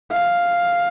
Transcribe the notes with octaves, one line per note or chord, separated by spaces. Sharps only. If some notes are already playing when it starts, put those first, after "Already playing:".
F5